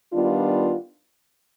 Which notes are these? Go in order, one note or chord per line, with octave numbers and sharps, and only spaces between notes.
D#3 G3 B3 D4 F4